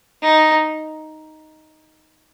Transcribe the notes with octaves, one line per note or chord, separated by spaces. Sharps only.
D#4